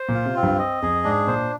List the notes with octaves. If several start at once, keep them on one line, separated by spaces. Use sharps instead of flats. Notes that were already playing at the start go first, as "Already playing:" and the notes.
Already playing: C5
A#2
F4
C3
C4
G2
D#5
F2 G#4
G#2 D4
A#2 C5